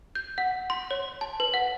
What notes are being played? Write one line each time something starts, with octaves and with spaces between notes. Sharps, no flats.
G6
F#5
C6
C#5
A5
B4
F#5